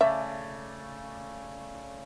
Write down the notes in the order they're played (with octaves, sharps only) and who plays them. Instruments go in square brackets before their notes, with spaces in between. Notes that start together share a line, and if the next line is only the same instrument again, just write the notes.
[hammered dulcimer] C#3 A3 D5 [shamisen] E5